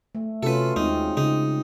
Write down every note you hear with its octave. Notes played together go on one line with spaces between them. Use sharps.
A3
C3 C#4 F4 F#4 A4 B4
D#2 G#3 C4 D#4
C#3 D#4